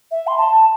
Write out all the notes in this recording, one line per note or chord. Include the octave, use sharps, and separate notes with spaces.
E5
C6
A5